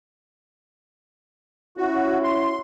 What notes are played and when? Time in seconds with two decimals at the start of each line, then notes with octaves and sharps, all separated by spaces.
1.77 C#4 E4 F#4
2.24 C6